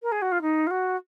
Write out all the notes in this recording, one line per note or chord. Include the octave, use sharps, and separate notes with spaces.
A#4
G#4
F#4
F4
D#4
F4
F#4